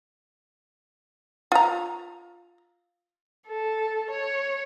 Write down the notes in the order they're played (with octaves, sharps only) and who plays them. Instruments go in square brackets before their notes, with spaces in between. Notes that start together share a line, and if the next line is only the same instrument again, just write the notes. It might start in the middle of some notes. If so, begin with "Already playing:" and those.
[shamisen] F4 A#5
[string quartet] A4
C#5